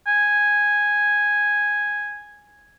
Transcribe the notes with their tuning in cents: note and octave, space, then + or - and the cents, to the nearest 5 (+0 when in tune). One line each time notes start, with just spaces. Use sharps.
G#5 -5